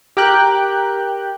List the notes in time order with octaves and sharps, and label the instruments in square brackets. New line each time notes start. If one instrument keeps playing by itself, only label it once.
[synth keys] G4 A#4 G5 F#6